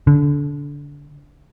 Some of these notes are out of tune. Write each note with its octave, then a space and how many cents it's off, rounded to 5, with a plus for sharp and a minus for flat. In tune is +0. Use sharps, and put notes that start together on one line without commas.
D3 -25